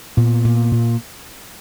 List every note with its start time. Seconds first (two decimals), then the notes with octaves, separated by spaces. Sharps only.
0.17 A#2 B3
0.45 A#2
0.72 A#2